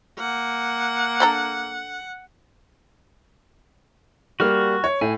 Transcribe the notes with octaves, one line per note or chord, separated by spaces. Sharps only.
A#3 F#5
D3 A4 A#5
G3 A#3 F#4 F6
C#5
A2 G#5